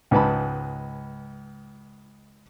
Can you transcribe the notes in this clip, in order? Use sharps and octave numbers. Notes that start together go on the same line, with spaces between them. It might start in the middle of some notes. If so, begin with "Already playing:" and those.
C#2 G#2 B4 A5 B5